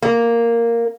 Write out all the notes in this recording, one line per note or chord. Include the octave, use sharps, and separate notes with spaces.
A#3